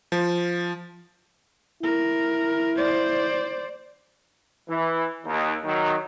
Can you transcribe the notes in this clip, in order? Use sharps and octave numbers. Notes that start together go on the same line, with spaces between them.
F3
E4 A#4
C5 D5
E3
D#2
D#3 F#3